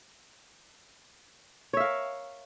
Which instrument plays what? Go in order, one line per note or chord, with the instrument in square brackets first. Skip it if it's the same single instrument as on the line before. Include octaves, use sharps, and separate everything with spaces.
[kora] C#5
E5
F5
A#4